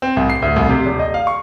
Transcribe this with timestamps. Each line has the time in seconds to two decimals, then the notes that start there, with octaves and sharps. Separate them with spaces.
0.02 C4
0.17 C2
0.30 C7
0.42 D2
0.56 C2
0.69 C3
0.86 D#1
0.99 D#5
1.14 F5
1.27 C#6